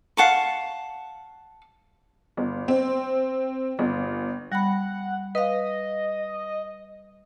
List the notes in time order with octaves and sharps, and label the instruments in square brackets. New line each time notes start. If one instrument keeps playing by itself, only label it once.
[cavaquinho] F5 F#5 A5 C#6
[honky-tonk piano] G1
C4
G1
[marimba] G3 B5 [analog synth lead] F#5
[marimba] B4 F5 [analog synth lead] D#5